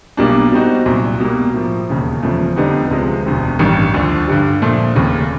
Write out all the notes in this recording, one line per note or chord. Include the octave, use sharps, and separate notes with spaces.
B1 B2 G3 A#3 D4
B2 G3 C4 D#4 F#4
C2 A#2 F#3
B2 G3 A#3
A2 F3 A#3
E1 D#2 C#3
F1 E2 C#3 F3 A3
F2 D3 G3 B3 D#4
C#2 C3 F3 G#3
E1 D2 C3
A1 G2 D#3 G3
D2 D3 F3
G2 D3 G3
A#2 F3 A3
F1 D#2 C#3